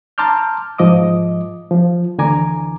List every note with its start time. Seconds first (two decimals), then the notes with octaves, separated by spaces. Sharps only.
0.18 A5 A#5 C6 D6 F6 G6
0.78 G#2 F3 D#5 D6 D#6
1.71 F3
2.18 D2 D3 E3 G#5 A#5 D6